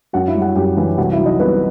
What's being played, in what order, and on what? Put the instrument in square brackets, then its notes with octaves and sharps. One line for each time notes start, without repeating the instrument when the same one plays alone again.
[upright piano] F#2 F#4 F#5
E4 E5
G3
F#4 F#5
F#2 G4 G5
E3
C2 F#4 F#5
E4 E5
F#3
D#4 D#5
C2 B3 B4